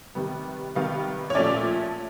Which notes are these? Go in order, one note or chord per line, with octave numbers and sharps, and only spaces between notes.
C3 D#3 G3 B3
C3 D#3 G3 B3 F5
C#5
A#2 F3 A3 C#4 D5